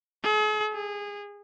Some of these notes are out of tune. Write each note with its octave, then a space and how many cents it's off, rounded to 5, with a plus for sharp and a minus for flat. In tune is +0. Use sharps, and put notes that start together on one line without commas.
G#4 +45
G#4 -25